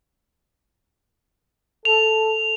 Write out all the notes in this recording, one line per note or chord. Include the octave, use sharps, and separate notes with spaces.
A4 F7